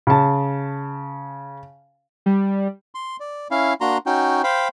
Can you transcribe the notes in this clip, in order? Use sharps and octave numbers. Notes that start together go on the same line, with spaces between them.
C#3 A5
G3
C6
D5
C#4 E4 F5
A#3 D4 F#4 A#5 C6
C#4 D#4 F#4 G5
C5 F5 G5 B5